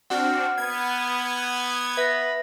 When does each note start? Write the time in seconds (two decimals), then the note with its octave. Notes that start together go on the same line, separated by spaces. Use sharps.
0.10 C4 D4 F#4 F#5 F6
0.58 B3 G#6
1.97 B4 E5 A#6